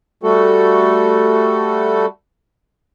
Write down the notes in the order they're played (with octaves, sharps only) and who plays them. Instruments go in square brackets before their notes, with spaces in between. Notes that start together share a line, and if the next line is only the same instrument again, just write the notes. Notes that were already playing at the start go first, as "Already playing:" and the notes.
[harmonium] G3 A3 F#4 A4